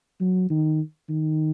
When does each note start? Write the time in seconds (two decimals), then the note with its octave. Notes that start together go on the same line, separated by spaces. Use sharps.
0.21 F#3
0.50 D#3
1.09 D#3